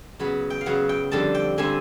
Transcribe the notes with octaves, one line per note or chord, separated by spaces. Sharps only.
C#3 F#3 B3 B5
G5
F5
C#3 F#3 B3 F#5
G5
F2 D3 G3 C4 A5
G5
D3 G3 C4 G#5